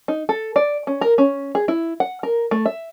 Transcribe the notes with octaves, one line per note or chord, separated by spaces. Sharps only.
D#4
A4
D5
C#4
A#4
C#4
G#4
E4
F#5
A#4
A3
E5